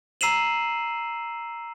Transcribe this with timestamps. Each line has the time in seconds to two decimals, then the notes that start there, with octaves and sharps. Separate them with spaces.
0.21 A#5 E6 C7 D#7 E7 F#7